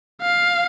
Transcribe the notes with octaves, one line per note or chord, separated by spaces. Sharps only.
F5